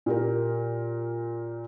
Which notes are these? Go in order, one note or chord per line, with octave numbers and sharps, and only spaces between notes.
A#2 G4 A#4